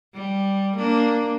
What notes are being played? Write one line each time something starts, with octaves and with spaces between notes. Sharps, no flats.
G3
A#3 D4